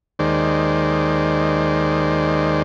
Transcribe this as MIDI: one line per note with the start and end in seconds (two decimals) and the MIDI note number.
0.19 2.62 39
0.19 2.62 51
0.19 2.62 56
0.19 2.62 72
0.19 2.62 74